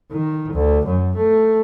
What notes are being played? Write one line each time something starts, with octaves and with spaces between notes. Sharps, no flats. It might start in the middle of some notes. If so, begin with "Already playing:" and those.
D#3
D2
F#2
A3